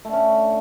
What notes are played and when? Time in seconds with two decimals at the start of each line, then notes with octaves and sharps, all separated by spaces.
0.05 A3
0.09 D3
0.13 C#4